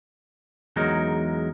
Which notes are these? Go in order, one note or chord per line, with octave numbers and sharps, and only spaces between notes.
E2 F#3 G#3 D#4 A#4